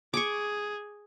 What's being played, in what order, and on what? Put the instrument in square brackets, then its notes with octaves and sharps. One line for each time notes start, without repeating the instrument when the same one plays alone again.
[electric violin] G#4 [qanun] C#6 D6